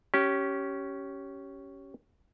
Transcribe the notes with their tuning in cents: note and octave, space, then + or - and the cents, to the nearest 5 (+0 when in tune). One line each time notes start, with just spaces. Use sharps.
C#4 +0 G4 -20